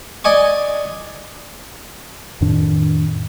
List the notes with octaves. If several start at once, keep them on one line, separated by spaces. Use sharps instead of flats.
D5 D#5 G#5 C#6
F2 A2 D#3 D4